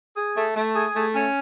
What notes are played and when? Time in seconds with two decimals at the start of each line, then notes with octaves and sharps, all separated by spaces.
0.15 G#4
0.35 A3
0.55 A3
0.75 G#4
0.95 A3
1.14 C#4